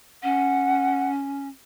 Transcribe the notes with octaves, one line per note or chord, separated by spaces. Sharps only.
C#4 F#5